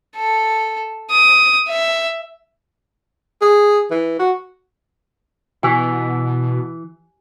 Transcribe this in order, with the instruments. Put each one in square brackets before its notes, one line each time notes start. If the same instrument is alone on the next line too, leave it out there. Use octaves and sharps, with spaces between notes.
[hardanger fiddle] A4
D#6
E5
[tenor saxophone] G#4
E3
F#4
[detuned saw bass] B2 [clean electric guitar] E3 [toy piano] G4 G#5